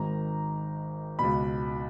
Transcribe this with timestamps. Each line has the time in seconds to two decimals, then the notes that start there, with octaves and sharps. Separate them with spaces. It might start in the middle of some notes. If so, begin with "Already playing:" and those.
Already playing: G#1 G#2 D#3 A#5
1.19 C#2 B2 B5